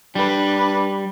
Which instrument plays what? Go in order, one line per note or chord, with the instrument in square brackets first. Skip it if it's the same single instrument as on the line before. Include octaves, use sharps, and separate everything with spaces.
[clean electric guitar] G3 [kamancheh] D4 B4